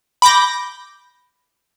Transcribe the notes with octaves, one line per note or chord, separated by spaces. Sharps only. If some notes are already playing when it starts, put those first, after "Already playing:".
B5 D6 G6 A#6